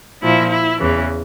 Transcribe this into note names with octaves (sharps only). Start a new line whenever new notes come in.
A#2 F3 E4
E4
E2 C#3 E3